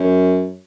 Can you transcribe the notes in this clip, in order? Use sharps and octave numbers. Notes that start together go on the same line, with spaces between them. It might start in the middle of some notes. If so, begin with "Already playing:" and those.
Already playing: F#2